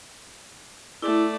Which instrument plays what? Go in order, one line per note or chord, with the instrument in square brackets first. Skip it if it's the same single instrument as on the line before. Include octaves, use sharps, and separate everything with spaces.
[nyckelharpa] A3 D5 [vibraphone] E4